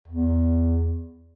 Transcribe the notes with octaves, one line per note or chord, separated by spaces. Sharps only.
E2